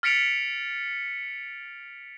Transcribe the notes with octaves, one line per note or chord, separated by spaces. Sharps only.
F6 A6 B6 C#7 D7 F7